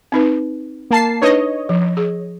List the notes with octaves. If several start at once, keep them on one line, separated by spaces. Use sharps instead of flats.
C4 D#4 B4
A#3 A5 C7
D4 D#4 B4 C#5 D#5
F3
G#4